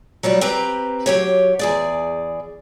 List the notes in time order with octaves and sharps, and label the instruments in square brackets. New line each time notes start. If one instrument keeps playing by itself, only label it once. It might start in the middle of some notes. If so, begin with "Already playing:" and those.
[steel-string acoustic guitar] F#3 G3 F#4 D5
C4 G4 B4 A#5
F#3 G4 C#5
E2 G#4 D5